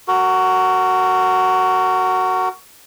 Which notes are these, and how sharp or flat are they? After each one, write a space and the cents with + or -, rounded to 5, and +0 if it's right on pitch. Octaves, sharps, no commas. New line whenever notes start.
F#4 +10 A#4 -25